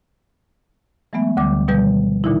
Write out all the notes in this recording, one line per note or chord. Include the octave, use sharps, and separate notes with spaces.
E3 F#3 G#3 A3 B3 E5
D2 D3 F#3 G3 D6
B2 D#3 F3 G3 B4 G6
A#2 D3 E3 D#4 E4